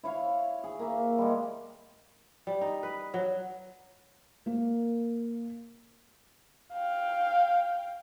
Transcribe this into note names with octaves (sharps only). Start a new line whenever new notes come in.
E4 C#5 F5
G#4
A#3 E5
G3 G#3
G3
D#4
B4
F#3
A#3 A#4
F5 G5